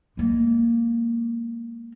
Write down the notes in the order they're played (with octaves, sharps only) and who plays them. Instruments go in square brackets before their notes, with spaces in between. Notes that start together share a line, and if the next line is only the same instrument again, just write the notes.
[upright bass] G#3 A#3